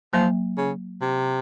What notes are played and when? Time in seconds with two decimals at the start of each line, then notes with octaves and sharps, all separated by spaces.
0.13 F3 F#3 A#3
0.58 C#3
1.01 C3